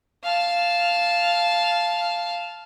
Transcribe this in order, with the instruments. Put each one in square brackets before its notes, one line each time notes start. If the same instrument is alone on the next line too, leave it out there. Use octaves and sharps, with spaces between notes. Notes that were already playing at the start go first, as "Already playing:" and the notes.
[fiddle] F5 A5